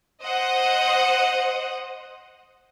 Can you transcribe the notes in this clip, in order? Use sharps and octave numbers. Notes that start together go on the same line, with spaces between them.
C5 D#5 F#5